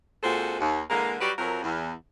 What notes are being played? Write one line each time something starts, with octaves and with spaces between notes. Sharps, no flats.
A#2 G#3 C4 F#4 A4 C5
D#2
D3 E3 G#3 A#3
F#3 G3 F#4 G4 B4 D5
F2 F#3 A#4
E2